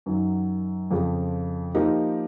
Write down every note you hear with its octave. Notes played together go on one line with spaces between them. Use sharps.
F#2 D#3 F#3
F2 C#3 F3
F3 A#3 D#4 G4 A#4